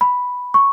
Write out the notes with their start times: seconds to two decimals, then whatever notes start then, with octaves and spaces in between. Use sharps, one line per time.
0.01 B5
0.54 C#6